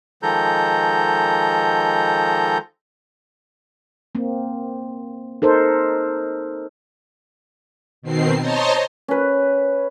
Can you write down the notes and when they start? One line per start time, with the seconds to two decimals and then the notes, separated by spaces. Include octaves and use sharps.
0.23 D#3 F3 G#3 A4 A#5 G6
4.15 A#3 C4
5.42 D#4 A4 A#4 C5
8.02 B2 D#3 C4 C7
8.39 C5 C#5 D#5 A5 A#5 C6
9.08 C#4 B4